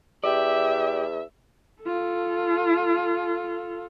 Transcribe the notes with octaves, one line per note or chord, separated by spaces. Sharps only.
E2 G4 D5 E5
F4 A4